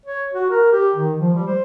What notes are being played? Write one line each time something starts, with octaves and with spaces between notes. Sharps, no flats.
C#5
F#4
A#4
G4
D#3
F3
G3
C5